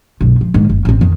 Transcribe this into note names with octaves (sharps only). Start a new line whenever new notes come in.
F#1 B1
F3
G#2 D#3
F#1
A1 C4
F2 D#3